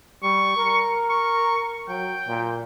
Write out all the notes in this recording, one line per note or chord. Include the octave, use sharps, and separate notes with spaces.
G3 C#6
A#4
C#6
F#3 G5
A#2